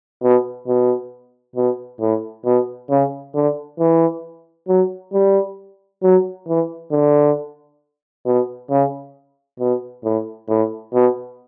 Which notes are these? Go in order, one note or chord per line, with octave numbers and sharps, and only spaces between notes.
B2
B2
B2
A2
B2
C#3
D3
E3
F#3
G3
F#3
E3
D3
B2
C#3
B2
A2
A2
B2